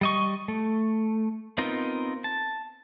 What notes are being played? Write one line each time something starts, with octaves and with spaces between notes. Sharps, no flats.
G3 D#5 C#6
A3
B3 C4 D#4 F4 A#4
A5